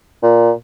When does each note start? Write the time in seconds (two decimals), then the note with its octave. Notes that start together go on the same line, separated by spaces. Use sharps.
0.23 A#2